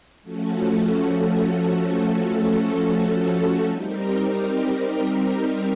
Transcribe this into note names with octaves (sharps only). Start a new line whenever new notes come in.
F3 A3 C#4 F#4 A4
G3 C4 D#4 G4 A#4